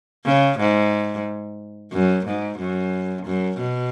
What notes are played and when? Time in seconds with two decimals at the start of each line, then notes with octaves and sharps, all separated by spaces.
0.26 C#3
0.59 G#2
1.93 F#2
2.26 G#2
2.59 F#2
3.26 F#2
3.59 B2